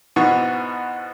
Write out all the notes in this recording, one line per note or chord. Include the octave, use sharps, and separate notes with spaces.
G#2 B2 E3 F#4 F#5 C#6